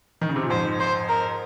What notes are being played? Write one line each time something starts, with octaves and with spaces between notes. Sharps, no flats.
D#3
C#3
C3
A#2
F2 G#2 C5
C5
A#4